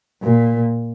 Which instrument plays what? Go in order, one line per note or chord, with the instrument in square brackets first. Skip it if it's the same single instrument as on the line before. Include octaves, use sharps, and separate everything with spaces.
[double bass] A#2